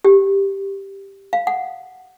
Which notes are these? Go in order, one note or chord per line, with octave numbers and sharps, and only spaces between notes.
G4
F5
F#5